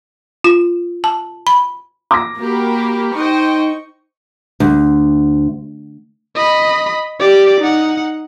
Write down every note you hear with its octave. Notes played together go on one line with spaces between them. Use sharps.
F4
A5
B5
D6 A#6
A#3 F#4 G4 A#4 B5
D#4 C5 D#5 G5 C#6
D2
D#5 B5
G4 D5
D#4 F#5